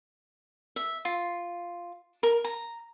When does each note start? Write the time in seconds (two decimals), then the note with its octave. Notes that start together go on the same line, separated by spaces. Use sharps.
0.76 E5
1.05 F4
2.23 A#4
2.45 A#5